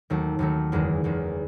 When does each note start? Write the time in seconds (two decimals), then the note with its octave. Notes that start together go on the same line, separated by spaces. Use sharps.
0.10 D#2 D#3 F#3 A3
0.39 D#2 D#3 F#3 A3
0.72 F#1 E2 D#3 G#3
1.04 F#1 E2 D#3 G#3